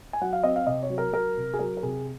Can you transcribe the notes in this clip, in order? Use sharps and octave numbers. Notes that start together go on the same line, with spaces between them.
G#5
F#3 F#5
F5
C4 D#5
F5
C3 D#5
C#5
F#3
A#4
F#3 A#4
C3
G#4
F#3 A#4
A#4
C3 G#4